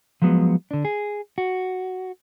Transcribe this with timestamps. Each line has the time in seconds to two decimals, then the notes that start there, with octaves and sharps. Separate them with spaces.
0.22 F3 F#3 G#3 B3
0.71 D3 D4
0.85 G#4
1.38 F#4